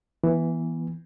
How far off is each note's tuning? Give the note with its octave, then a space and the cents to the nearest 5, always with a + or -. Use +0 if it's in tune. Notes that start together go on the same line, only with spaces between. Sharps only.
E3 +0 B3 -30